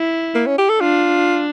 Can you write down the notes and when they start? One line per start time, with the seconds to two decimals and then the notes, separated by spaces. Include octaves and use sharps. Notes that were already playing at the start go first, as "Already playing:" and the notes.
Already playing: E4
0.35 A#3
0.46 C#4
0.58 G4
0.69 A4
0.80 D4 F4